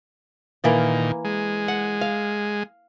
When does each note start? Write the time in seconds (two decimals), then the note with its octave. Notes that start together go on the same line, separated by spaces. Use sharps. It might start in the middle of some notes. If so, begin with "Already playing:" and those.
0.64 A#2 D#3 E3 A#3 D5
1.25 G#3
1.68 F#5
2.01 F5